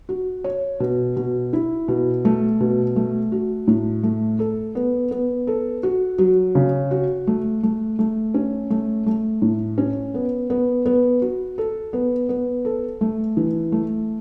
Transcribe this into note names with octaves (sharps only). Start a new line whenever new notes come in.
F#4
C#5
B2
B2
E4
B2
A3
B2
A3
F#4
A2
A3
A4
B3
B3
A4
F#4
F#3
C#3
F#4
A3
A3
A3
C#4
A3
A3
A2
C#4
B3
B3
B3
F#4
A4
B3
B3
A4
A3
E3
A3